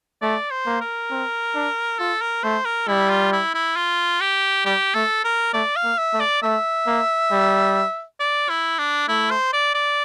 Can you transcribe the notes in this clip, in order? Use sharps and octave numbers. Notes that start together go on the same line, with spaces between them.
A3 D5
C5
A#3
A#4
C4
D4
F4 A4
A#4
A3 C5
A#4
G3 E4
F4
E4
E4
F4
G4
G3 G4
A3 A4
A#4
A3 D5
F5
A#3
E5
A3
D5
A3 E5
A#3
G3
D5
E4
D4
A3 E4
C5
D5
D5